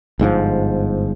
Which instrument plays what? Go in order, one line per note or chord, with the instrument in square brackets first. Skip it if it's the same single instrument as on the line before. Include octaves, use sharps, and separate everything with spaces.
[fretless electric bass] G1 G#2 C3 F3